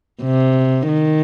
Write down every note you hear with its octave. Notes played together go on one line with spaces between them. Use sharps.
C3
D#3